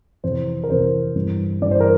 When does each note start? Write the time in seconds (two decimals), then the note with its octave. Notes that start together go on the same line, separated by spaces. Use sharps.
0.24 F2 C3 E3 C5
0.64 A#4
0.70 F2 C3 E3 C5
1.16 G2 E3
1.62 G2 E3 D5
1.71 C5
1.80 A#4